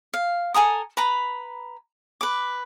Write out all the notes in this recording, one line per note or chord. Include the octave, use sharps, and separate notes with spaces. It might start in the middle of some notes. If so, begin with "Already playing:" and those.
F5
A4 G#5 A#5 D#6
B4 A#5 B5
B4 D6